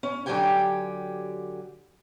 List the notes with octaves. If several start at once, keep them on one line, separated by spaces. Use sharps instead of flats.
C#4
D3 F#3 F#4 G4 G5 G#5